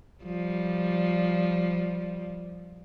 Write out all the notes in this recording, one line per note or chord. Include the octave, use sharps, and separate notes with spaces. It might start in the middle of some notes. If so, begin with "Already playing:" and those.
F3 G3